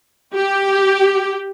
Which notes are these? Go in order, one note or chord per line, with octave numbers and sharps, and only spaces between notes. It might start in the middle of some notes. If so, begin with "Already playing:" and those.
G4